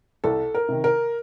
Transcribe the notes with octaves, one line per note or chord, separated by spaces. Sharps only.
C2 A4
A#4
C3 D#3
A#4